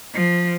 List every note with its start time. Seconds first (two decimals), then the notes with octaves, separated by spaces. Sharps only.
0.14 F3